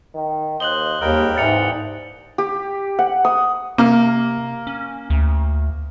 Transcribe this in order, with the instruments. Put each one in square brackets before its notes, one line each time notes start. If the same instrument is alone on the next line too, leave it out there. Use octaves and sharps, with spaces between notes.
[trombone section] D#3
[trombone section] D#2 [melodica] C5 D#5 [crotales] F#6 F#7 G7
[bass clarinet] D#2 [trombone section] G#2 C#3 A#3 [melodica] G3 A#4 G5 [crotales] D#6
[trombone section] C2 F2 E3 [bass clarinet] G#2 [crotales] A6 C#7 F7
[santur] G4
F#5
D#6
[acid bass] C3 [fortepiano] A#3 F6
[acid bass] C#4
D2